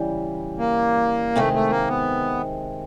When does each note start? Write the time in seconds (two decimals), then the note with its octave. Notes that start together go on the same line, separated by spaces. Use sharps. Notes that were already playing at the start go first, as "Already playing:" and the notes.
Already playing: C#3 E3 G3
0.58 A#3
1.36 C3 D#3 G#3 A3 C4
1.53 A3
1.70 A#3
1.88 B3